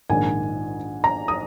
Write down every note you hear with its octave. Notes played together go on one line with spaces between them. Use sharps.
A#1 G#2 D#3 G#5
A#5
D#6